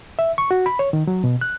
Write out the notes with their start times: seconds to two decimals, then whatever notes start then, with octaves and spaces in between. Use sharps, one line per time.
0.19 E5
0.38 C#6
0.51 F#4
0.66 B5
0.79 C#5
0.93 D#3
1.07 F#3
1.24 B2
1.41 F#6